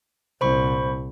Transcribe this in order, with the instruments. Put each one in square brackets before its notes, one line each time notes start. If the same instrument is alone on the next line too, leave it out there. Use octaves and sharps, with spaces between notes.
[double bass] C2 A#2 [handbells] C5 B5 C#6